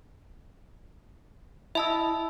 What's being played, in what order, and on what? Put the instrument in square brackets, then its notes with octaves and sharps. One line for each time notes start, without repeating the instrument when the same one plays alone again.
[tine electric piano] E4 D#5 [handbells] E5 A5 E6